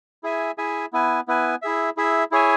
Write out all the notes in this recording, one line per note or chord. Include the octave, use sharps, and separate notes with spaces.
E4 G#4 E5 G#5
E4 G#4 E5 G#5
B3 E4 B4 G#5
B3 E4 B4 G#5
E4 G#4 E5
E4 G#4 E5
E4 G#4 C#5 E5 G#5